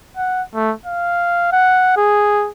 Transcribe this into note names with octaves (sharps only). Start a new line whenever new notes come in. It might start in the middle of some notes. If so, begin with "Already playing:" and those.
F#5
A3
F5
F#5
G#4